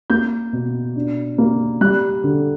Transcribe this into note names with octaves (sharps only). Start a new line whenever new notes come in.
A#3 G6
B2
D4
A#3
G3 F#6
D3